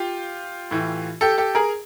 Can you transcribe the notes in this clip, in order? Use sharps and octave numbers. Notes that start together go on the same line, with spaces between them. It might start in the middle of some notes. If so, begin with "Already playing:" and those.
Already playing: F4 G4
A2 E3
G4 A4
G4 A4
G#4 A#4